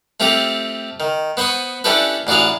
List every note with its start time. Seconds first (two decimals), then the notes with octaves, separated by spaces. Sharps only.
0.20 A3 C4 F4 G4 A4
1.00 D#3
1.37 B3 C5 B5 C#6 D#6
1.84 C#4 D4 E4 G4 A4 B4
2.27 A1 D4 F#4 G#4 F5